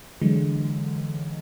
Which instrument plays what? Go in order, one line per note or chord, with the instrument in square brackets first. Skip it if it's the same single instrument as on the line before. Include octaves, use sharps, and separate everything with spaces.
[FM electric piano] D3 E3 F#3 G#3